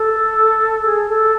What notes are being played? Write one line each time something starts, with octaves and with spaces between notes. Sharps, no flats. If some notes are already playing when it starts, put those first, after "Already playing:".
Already playing: A4
G#4
A4